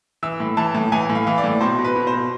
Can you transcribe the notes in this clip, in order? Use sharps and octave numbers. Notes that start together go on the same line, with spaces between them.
E3 E6
A2
E3 A5
A2
E3 G#5
A2
F5
E3
D5
A2
B2 C5
B2
B4
B2
C5
B2